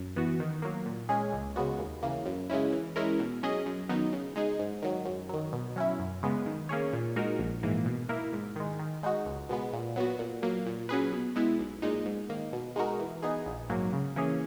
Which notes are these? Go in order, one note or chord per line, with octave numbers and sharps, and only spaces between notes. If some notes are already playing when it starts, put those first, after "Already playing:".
Already playing: F#2
E3 B3 F#4
D#3
F#3 A#3
A#2
G#3 C#4 G#4
C#2
C#3 G#3 B3 F#4
D#2
C#3 E3 A#3
F#2
C#3 G#3 C#4 E4
E3
G#3 C#4 E4 A#4
B2
F#3 C#4 G#4 D#5
F#2
D#3 F#3 B3 D#4
C#3
G#3 D#4 G#4
G#2
D#3 F#3
F#2
D#3 F#3
B2
F#3 C#4 E4
F#2
C#3 G#3 B3
D#3
A#3 C#4 G#4 C#5
A#2
G#3 D#4 F#4 A#4
A#1
G#2 E3 A#3
B2
A#3 E4 A#4
G#2
D#3 G#3
D#3
G#3 D#4 F#4
C#2
B2 G#3 B3
A#2
F#3 B3 F#4
A#2
F#3 A#3
A#2
F#3 C#4 G#4 B4
B2
G#3 B3 E4
B1
A#2 G#3 D#4
G#2
D#3 A#3
B2
G#3 D#4 F#4 A#4
E3
B3 D#4 G#4
A#1
G#2 F#3 A#3
C#3
E3 A#3 C#4 G#4